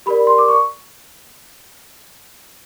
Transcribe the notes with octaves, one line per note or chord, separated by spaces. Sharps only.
G4 A#4 D5 B5
C6
D6
C#6